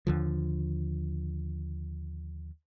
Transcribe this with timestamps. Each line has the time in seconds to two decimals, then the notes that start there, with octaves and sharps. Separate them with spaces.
0.07 D#2 D3 F3